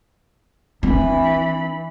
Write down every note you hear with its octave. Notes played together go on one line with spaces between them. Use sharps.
E3 C4 D4 B5